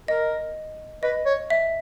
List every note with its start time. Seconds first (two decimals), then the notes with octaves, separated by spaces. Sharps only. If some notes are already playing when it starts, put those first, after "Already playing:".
0.08 A#4 D#5
1.03 B4 D#5
1.26 C#5
1.50 E5